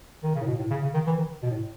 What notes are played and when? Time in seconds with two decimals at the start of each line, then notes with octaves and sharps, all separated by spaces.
0.23 D#3
0.35 C#3
0.41 A2
0.47 B2
0.59 A2
0.70 C#3
0.82 C#3
0.94 D#3
1.07 E3
1.18 D#3
1.42 B2
1.51 A2